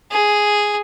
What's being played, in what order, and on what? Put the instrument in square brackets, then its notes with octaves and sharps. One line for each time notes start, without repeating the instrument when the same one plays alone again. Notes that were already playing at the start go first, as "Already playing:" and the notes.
[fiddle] G#4